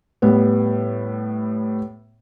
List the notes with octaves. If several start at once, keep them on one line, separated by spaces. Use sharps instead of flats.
A2 G3 B3